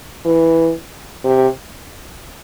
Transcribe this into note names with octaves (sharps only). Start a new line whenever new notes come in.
E3
C3